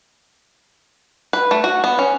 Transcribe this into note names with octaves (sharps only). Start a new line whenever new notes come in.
B4
A3
F#4
B3
C#4